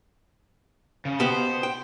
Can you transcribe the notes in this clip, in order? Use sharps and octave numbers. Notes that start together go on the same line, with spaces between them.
C#3
B2 B3 G4 C5
G5